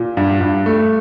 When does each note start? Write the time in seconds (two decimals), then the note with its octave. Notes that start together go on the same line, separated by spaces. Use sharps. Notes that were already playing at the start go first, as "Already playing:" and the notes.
Already playing: A#2
0.17 G2
0.41 G2
0.66 A3